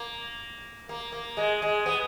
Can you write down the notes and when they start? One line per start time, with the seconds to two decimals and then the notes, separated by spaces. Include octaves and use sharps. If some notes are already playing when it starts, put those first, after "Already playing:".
Already playing: A#3
0.89 A#3
1.12 A#3
1.37 G#3
1.62 G#3
1.86 B3